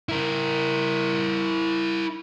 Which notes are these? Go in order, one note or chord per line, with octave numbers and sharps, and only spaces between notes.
E4 A#4